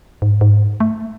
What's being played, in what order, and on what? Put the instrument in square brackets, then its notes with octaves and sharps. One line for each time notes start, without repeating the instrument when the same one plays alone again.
[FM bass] G#2
G#2
A3